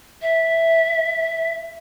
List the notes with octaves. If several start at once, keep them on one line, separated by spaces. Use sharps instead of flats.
E5